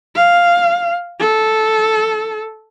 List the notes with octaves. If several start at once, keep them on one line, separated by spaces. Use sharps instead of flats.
F5
A4